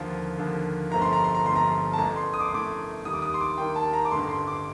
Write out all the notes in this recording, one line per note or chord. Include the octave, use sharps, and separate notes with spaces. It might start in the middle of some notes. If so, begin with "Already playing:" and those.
Already playing: D#2 D3 F3
D#2 D3 F3
G1 G2 F3 A3 A#5
C6
A#5
C6
A#5
G1 G2 F3 A3 C6
A#5
A5
A1 A2 A3 A#5
C6
D#6
D6
C6
A1 A2 A3 D6
D#2 D#3 G3 D#6
D6
D#6
C6
D6
D#2 D#3 G3 G5
A5
A#5
D6
A1 G2 D3 A3 C6
C6
D6